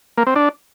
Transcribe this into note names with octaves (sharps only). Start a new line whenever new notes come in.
A#3
C4
D4